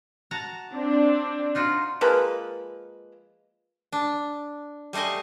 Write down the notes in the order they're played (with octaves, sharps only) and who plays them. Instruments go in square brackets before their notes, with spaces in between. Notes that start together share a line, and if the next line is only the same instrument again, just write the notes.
[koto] F#4 A5 A#5
[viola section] C4 D4
[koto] D#4 F4 F#4
[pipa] F3 G#3 A#3 B4
[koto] D4
G3 A3 C5 D#5 G#5